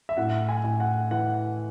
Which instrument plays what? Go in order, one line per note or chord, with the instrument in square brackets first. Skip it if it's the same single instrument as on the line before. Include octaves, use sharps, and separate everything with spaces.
[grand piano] E5
A2 F#5
G#5
A2
F#5
E3 F#5